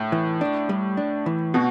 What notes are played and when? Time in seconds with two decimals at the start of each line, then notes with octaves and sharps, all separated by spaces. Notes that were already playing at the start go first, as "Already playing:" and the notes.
Already playing: A2
0.12 E3
0.41 D4
0.69 G3
0.97 D4
1.26 E3
1.54 B2 F#4